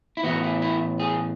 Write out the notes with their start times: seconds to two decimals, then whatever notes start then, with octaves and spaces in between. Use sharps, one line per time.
0.17 E4
0.23 A2 E3 B3 F#4
0.43 E4
0.62 E4
1.00 G#4